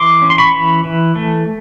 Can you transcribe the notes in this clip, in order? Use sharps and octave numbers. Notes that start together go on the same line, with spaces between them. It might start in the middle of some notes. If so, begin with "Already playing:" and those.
Already playing: E3 C6 D6
C#4
C6
B5 C#6
E3
E3
A3